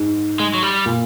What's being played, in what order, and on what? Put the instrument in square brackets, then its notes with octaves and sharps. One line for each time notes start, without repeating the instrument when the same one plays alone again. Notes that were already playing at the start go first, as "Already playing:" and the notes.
Already playing: [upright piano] G#2
[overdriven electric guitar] G#3
F#3
G3
[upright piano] A#2